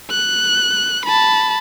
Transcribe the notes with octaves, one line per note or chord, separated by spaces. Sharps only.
F#6
A5 B5